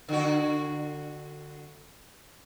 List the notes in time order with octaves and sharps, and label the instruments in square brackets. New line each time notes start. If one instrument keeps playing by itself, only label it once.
[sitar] D3 F#4